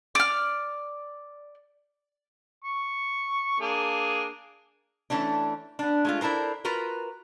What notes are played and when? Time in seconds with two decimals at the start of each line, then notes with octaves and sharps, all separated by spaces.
0.15 D5 F6
2.64 C#6
3.60 A#3 D4 G#4
5.10 E3 A3 C#4 D4
5.79 B3 D4
6.05 G#3 A3 F4
6.21 D4 E4 A4 A#4 C5
6.65 F4 F#4 A#4 B4